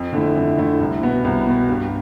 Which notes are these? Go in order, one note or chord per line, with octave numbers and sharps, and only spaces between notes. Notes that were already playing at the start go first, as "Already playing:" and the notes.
Already playing: F2
D3 A3 E4
F2
D3 A3 E4
C2
B2 B3
C2
B2 B3
G2